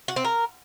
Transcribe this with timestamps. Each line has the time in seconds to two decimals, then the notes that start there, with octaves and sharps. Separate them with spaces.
0.08 F#4
0.16 C4
0.25 A#4